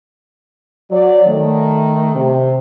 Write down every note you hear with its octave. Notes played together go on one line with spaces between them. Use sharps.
F#3 D5
D#3 A3
C3